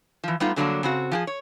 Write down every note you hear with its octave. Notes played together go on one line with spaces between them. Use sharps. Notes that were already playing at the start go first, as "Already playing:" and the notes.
E3 F3
G3 A3 B3 D#4 F4
A2 D3 F#3 G3 A#3 D4
C#3 C4 F#4
F3 G4 G#4
C#5